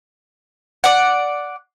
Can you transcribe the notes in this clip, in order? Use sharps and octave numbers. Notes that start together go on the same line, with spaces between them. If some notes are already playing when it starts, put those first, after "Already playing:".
D5 F#5